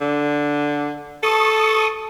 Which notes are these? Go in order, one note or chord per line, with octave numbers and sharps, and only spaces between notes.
D3
A4 A5 C#6 D#6